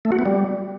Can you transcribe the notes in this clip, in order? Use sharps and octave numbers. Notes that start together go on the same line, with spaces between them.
A3
F#4
B3
G3